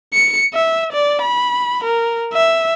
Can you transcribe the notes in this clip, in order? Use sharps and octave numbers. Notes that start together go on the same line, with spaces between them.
C#7
E5
D5
B5
A#4
E5